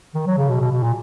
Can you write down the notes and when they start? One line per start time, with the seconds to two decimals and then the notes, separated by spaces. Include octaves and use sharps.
0.15 D#3
0.27 F#3
0.38 C#3
0.49 B2
0.61 B2
0.72 B2
0.83 A#2